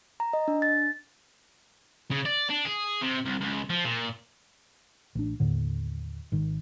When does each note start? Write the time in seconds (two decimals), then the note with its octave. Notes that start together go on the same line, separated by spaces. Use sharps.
0.20 A#5
0.33 D#5
0.48 D4
0.62 A6
2.11 C#3
2.25 D5
2.50 D4
2.65 G#4
3.02 C3
3.26 C2
3.41 C#2
3.70 F3
3.85 A#2
5.15 A1 D4
5.40 D#2 A2 D3
6.32 G#1 D#3